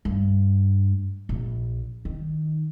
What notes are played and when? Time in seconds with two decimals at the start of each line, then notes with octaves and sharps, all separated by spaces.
0.05 G2
1.29 A#1
2.05 D#3